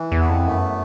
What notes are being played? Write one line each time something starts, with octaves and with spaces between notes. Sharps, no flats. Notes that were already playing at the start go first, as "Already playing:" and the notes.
Already playing: E3
E2
B3
F2
F#2 A3